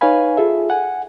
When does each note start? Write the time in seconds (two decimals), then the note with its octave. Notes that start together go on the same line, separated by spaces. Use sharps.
0.01 D#4 B4 C#5 F5 G#5 B5
0.37 F4 G#4 A4 E5
0.70 F#5 G#5